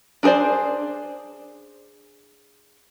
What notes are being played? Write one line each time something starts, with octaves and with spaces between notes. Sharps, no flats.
D4 G#4 A#4 C5 D5